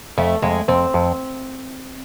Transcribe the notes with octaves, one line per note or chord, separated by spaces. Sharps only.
F2 A3
F2 G#3
F2 C4
F2